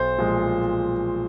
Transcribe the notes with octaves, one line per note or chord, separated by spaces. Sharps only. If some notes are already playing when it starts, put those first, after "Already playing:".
Already playing: B1 C5
A#2 F3 G#3